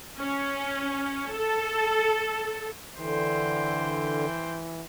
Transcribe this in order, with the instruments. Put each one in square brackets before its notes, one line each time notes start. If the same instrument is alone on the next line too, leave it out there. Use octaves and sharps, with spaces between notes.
[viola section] C#4
A4
[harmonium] D3 [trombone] E3 [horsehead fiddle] C5 G5